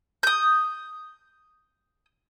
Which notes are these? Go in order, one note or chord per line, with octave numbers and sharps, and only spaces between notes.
D#6 G6